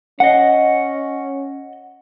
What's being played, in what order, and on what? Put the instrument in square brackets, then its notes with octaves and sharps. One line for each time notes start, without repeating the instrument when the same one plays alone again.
[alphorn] C#4 [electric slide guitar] D#5 F#5